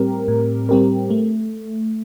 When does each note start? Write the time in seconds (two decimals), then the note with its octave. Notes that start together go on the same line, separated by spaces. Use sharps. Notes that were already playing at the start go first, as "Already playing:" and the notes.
Already playing: A2 G3 C4 G4 A#4
0.28 A2
0.69 G3 C4 G4 A#4
1.10 A3